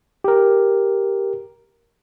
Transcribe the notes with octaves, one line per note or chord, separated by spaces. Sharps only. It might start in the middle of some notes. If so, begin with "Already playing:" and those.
G4 A#4